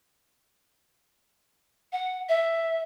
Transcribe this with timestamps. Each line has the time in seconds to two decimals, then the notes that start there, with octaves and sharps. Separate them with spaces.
1.92 F#5
2.29 E5